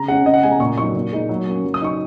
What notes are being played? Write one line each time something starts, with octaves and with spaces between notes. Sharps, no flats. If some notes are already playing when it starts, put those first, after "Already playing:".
Already playing: C#3 A#5
G#3 C#4 F#5
C#3 D#5
F#5
G#3 C#4 G#5
A#5
A#2 C#6
F#3 D#4 C#6
A#2
G#3 D#4
F#3
A#3 C#4
F#3
D#6
D#4 C#6